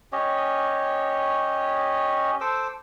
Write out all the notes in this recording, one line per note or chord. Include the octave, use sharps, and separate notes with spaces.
C#4 G4 C#5 D#5
A4 C5 D6 E6